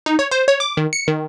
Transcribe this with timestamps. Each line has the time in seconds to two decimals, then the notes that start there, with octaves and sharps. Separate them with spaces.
0.06 D#4
0.19 C#5
0.31 C5
0.48 C#5
0.60 D6
0.77 D#3
0.93 C#7
1.08 D#3